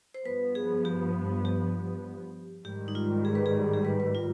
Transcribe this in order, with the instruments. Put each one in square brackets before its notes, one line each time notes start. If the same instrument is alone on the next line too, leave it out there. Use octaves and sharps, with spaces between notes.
[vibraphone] C5
[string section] G2 F3 B3 [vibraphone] B4
[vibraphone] G#4
G4
G4
[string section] G#2 D#3 G3 [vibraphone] G4
[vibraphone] D#4
F4
G#4
B4
G#4
G#4
B4
B4
F4